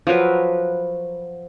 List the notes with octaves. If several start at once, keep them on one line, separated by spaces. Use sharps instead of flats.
F3 F#3 A#4 B4